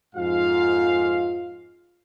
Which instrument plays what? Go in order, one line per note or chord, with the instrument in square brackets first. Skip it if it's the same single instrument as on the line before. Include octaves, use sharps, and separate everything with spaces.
[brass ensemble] F2 G#2 F4 F5